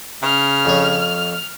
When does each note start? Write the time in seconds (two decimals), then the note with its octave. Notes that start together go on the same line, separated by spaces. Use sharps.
0.23 C#3 F6
0.65 F2 C#5